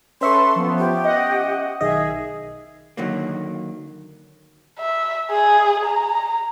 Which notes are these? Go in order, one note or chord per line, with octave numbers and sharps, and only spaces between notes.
C#4 A4 B4 E5 C6 C#6
F3 B3
G4
D#5 F#5
B1 D#3 G#4 D#5 E5
D3 D#3 F#3 A#3
E5
G#4
A#5